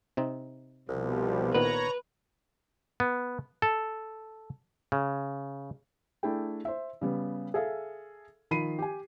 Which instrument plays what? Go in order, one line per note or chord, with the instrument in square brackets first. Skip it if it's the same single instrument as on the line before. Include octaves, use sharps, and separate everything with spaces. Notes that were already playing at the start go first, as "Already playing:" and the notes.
[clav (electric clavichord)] C3 C4 D#4
[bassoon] C2 [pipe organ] B2 F3 G3
[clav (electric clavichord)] A#2 D#3 B3 [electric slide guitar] B4 [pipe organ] C#5 A#5
[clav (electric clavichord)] B3
A4
C#3
[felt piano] A3 D4 E4 G#4 G5
C5 E5
C#3 G3 B3
G#4 A4 E5 F5
D#3 F3 B5 C7 D#7
G4 G#5